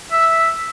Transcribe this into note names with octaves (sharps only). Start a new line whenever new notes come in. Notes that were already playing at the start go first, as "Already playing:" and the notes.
E5